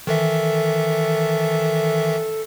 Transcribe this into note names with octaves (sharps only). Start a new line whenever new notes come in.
D#3 E3 A4 E5